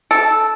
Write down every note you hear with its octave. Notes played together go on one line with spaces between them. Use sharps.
A4